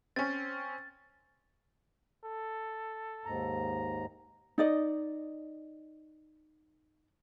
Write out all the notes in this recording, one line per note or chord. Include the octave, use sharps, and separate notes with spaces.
C4 C#4 A6
A4
D#2 G#2 A#5
D#4 D5 D#5